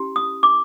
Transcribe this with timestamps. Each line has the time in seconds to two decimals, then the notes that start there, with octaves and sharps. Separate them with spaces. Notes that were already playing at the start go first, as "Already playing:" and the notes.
Already playing: C#4 E4 G4
0.16 D#6
0.43 D6